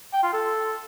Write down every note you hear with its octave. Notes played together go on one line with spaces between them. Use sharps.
G5
F4
A4